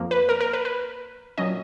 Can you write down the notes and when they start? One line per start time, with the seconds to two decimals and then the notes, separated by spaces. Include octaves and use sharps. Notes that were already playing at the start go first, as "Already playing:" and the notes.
Already playing: F2 F3 A#3
0.11 B4
0.29 A#4
0.41 A#4
0.53 B4
0.65 B4
1.38 A#2 F#3 C#4 D#5